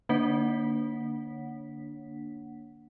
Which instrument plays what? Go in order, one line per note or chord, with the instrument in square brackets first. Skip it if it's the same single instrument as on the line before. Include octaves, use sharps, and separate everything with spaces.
[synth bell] D3 A#3 D4 C#5 F#5 B6